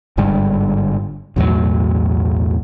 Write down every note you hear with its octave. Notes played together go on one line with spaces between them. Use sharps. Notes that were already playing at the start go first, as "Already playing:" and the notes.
G1 G#2 D3 G3
B1 E2 A2 F#3